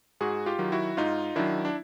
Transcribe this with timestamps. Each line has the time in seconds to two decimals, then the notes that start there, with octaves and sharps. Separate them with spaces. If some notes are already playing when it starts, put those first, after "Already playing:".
0.21 G#2 F#4 G#4
0.46 F4 G4
0.59 D#3 F#3
0.72 E4 F#4
0.97 G#2 D#4 F4
1.36 D#3 F#3 D4 E4
1.65 D4